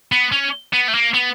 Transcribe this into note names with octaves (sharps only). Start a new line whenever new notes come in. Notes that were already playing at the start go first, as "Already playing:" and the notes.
B3
C#4
B3
A3
A#3
B3